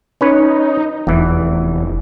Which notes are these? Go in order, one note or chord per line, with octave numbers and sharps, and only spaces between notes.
C#4 D#4 B4 C#5
F1 E2 E3